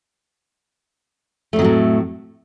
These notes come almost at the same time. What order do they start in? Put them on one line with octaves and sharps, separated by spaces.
A3 F2 D#3 F#3 A2